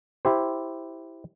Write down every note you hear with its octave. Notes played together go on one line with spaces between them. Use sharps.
E4 G4 C5